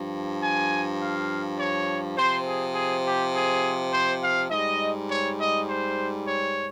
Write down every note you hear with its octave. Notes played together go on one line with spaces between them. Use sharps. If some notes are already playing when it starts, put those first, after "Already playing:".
Already playing: G2 F3
G#5
F5
C#5
C3 F3 C5
G#4
G#4
G4
G#4
C5
F5
G#2 G3 D#5
C#5
D#5
C5
C#5